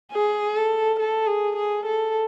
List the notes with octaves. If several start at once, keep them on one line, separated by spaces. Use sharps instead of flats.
G#4
A4
A4
G#4
G#4
A4